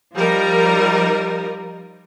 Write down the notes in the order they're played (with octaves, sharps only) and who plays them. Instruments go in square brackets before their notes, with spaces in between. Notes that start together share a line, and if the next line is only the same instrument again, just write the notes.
[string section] F3 G3 D#4 A#4